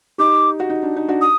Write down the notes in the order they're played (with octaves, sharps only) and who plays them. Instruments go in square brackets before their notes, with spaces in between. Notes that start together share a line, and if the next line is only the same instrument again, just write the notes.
[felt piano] D#4 G4 [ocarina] D6
[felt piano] F#4
D#4
D4
D#4
D4 F#4
[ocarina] D#6